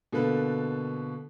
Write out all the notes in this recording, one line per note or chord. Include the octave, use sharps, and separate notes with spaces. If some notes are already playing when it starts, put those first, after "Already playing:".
B2 D3 A#3 A4 B4